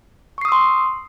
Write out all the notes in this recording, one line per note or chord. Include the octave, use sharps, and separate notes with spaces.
C6 C#6 D#6 E6 C7